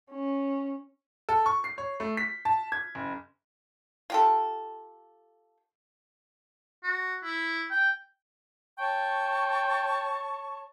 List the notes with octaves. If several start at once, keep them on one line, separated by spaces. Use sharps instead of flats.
C#4
A4
C#6
C7
C#5
A3
B6
A5
G#6
F#1
F4 G4 A4
F#4
E4
G5
C#5 G5 A5 C#6